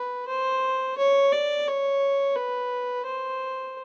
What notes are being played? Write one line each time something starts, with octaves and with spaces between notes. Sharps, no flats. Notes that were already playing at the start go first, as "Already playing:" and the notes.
Already playing: B4
C5
C#5
D5
C#5
B4
C5